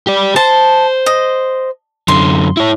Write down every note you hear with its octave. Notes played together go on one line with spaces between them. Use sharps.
G4 D5
C5 A5
D#5
F#2 D3 C6
E4 C#5